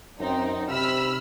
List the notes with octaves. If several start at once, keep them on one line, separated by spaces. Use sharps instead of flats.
F#2 C4 D#4
C3 B5 E6 F6